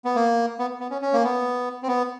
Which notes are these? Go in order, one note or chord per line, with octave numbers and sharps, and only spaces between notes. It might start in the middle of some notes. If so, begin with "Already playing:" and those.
B3
A#3
B3
B3
C#4
C#4
A#3
B3
C4
B3